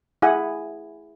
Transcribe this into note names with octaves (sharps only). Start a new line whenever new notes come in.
E4 G#4 F#5 G#5